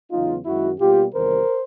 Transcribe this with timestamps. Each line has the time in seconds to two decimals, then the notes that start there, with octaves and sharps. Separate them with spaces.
0.11 E2 C#3 F#3 B3 D#4 F4
0.45 F#2 D#3 G#3 E4 F#4
0.79 B2 G3 A#3 F4 G4
1.14 E2 C3 D#3 G3 A#4 C5